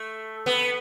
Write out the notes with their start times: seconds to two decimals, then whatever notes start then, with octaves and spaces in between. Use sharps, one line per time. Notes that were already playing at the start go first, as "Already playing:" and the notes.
Already playing: A3
0.46 B3